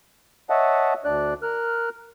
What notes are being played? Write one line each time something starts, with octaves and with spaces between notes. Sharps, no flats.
C#5 D#5 E5 F#5 A5
D2 D4 D5 F#6
A#4 F6 F#6